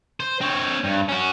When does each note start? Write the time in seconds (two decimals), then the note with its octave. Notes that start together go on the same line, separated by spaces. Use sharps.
0.20 C5
0.41 C4 C#5
0.84 G2
1.09 C#4 F#4